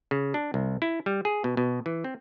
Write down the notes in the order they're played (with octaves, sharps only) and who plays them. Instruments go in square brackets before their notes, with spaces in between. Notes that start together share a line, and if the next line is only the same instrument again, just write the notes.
[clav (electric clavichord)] C#3
D4
C2
E4
G3
G#4
B2
B2
E3
C4